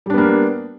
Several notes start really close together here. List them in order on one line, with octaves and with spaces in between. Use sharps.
G3 D4 B3 A#3